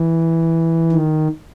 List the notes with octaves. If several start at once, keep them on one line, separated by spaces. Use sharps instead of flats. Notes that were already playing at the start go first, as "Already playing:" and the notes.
Already playing: E3
D#3